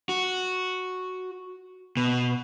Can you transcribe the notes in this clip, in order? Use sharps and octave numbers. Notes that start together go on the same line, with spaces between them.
F#4
B2